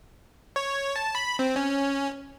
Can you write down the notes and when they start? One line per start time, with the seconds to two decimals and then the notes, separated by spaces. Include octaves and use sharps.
0.56 C#5
0.96 A5
1.15 B5
1.39 C4
1.56 C#4